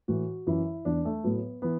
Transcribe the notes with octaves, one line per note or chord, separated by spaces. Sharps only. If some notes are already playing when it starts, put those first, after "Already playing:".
A2 E3 F#4
F#2 E3 E4
E2 E3 D4
A3
A2 F#3 B3
E3 B3